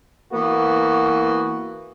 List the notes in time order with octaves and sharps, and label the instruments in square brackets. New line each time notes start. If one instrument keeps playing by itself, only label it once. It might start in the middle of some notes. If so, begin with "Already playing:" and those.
[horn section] E3 A#3 B3 F#4